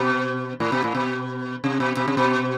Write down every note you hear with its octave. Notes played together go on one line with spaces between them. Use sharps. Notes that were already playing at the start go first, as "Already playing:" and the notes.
Already playing: B2
A2
B2
A2
B2
C3
B2
B2
C3
B2